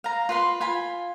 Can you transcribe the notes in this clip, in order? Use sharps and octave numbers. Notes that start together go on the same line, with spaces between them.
F5 A#5
F4 B4 C6
F4 G#5 B5